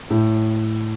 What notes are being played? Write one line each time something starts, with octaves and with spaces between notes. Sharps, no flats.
A2